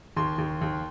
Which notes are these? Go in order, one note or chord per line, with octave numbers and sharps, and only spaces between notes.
D#2 C6
D#2
D#2